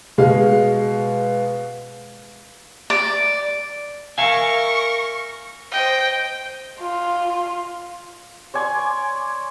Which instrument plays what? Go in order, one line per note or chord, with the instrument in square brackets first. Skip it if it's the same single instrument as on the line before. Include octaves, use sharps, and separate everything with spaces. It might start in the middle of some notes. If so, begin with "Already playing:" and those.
[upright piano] B2 G#3 F5
[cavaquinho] D5
[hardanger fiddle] A#4 [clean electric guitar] E5 F5 G#5 [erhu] C#6
[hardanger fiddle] C5 D#5 [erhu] G5
[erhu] F4
[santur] C#5 D5 G#5 C6